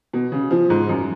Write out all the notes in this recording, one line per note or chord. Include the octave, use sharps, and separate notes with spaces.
B2
C#3
F3
G#2
F#2